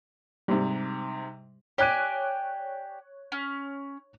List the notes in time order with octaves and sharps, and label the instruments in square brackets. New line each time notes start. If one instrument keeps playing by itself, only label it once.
[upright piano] G#2 C3 [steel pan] G3
[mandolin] G4 D5 G#5 [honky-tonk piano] C#5 F#6 D#7
[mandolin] C#4